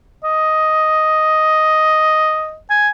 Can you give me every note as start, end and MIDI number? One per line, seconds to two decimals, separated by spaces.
0.24 2.57 75
2.70 2.89 80